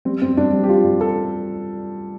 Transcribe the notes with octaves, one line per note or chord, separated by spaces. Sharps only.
G3 C4
G2 C4
G2 D4
G3
G4
G3 F4
G2
A4